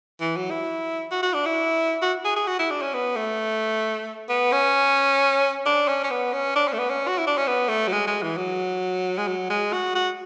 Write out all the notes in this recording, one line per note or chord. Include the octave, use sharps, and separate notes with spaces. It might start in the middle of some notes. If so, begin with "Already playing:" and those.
E3
F#3
E4
F#4
F#4
D4
E4
F#4
G#4
G#4
F#4
E4
D4
C#4
B3
A3
B3
C#4
D4
C#4
C#4
B3
C#4
D4
C#4
A3
B3
C#4
F#4
E4
D4
C#4
B3
A3
F#3
G#3
G#3
E3
F#3
G#3
F#3
G#3
F#4
F#4